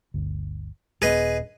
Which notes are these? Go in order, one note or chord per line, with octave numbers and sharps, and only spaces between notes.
G1 D2
D#1 B3 G#4 B4 D#5